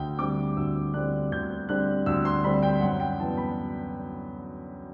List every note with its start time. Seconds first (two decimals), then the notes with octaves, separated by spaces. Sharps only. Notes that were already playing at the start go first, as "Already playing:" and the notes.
Already playing: D2 G5
0.19 D3 G3 C4 D6
0.57 D2 E6
0.94 D3 G3 C4 F#6
1.32 D2 G6
1.69 D3 G3 C4 F#6
2.06 D2 E6
2.25 C6
2.44 D3 G3 C4 B5
2.63 G5
2.81 F#2 F#5
3.00 G5
3.19 E3 B3 A5
3.37 B5